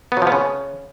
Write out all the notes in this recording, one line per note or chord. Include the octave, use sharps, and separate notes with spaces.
B3
F#3
F3
B3
C#3